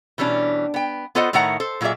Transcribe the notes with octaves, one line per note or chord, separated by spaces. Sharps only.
B2 E3 G3 C#4 D4
B3 G5
B3 F4 A4 C5 D#5 F#5
A2 D#3 A3 C#5 F#5 A#5
A4 C5
A#2 F#3 F4 G#4 D5 E5